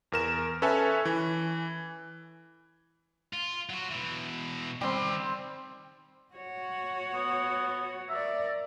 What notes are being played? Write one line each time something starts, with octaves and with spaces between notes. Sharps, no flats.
E2 A#4 E7
C#4 A4 B4 C#5 E5 G#5
E3
F4
F#3 F#4
B2 E3
D#3 G3 C4 C6
F#4 C#5
B3
A#4 D5 E5